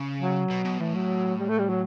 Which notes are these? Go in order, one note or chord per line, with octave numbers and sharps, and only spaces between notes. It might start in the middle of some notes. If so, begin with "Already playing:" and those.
Already playing: C#3
F#3
B2
B2
A2 E3
F#3
G3
A3
G3
F#3